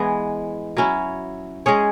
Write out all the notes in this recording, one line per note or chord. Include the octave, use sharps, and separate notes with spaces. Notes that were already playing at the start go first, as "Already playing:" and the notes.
Already playing: E3 G#3 B3
F#3 C#4 E4
G#3 C#4 G#4 C#5